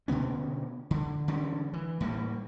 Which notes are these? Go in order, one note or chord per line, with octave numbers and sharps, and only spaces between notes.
B2 D3 B3 C#4
D3
D3 E3 G3 C#4
E3
A2 G3 A#3